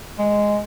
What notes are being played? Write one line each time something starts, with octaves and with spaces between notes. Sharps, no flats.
G#3